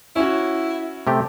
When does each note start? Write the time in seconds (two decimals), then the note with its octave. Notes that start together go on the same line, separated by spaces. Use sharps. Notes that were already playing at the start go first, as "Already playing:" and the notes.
0.16 C#4 E4 F#4
1.07 C3 A3 G4